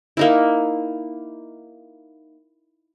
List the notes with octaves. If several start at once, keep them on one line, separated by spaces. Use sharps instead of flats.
A#3 D#4 E4